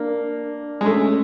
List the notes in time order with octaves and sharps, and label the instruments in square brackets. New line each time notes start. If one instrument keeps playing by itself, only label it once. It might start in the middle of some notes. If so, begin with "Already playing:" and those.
Already playing: [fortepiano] A#3 [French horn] D4
[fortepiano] G#3
[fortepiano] A3 [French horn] C#4